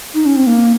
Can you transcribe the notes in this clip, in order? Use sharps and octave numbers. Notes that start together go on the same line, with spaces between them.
D#4
C#4
C4
A#3